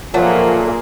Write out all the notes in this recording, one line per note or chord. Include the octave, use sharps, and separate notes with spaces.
A#2 F3 F#3 A3 A#3 G#4